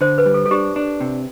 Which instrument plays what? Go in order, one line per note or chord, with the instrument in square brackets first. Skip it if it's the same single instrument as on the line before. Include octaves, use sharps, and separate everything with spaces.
[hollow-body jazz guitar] D3 [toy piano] C5
[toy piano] B4
[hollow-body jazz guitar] G3
[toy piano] A4
A4
[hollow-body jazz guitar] D4 [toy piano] G4
[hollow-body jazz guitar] D4
C3